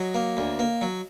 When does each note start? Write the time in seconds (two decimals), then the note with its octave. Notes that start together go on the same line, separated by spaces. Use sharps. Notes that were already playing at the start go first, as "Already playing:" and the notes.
Already playing: F#3 C#5 D#5
0.14 A#3
0.37 D2
0.59 A#3
0.81 F#3